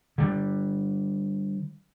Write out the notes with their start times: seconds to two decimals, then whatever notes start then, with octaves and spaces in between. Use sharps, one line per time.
0.18 D3 G3